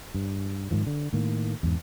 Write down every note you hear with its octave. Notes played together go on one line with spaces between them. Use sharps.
G2
G#2 D#3 F3
D3
A2 D#3 A#3
E2 G#2